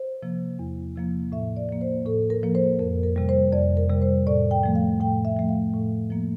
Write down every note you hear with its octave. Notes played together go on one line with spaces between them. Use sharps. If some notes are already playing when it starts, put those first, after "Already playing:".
Already playing: C5
C3 F3 A#3
E2
C3 F3 A#3
A2 E5
D5
F3 A#3
C5
A2 A4
A#4
F3 A#3
C5
F2 A#4
A#4
C3 G3
C5
F2 D5
A#4
C3 G3
C5
A2 D5
G5
F3 A3
F5
A2 G5
E5
F3 A3
F5
A2
F3 A#3